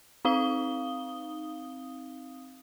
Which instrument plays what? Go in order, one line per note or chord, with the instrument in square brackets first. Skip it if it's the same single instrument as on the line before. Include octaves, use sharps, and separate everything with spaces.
[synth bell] C4 D#4 F5 D#6 G7